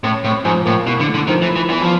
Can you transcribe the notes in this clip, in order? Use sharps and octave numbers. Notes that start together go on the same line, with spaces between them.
A2 C#4
A2 C3
G#2 F3
A2 A#3
B2 E4
D3
A3
D3
D#3 F3
E3
E4
E3
E2 E3
F3